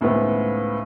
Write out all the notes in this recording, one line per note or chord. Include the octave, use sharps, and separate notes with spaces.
C#2 A2 D#3 B3 C4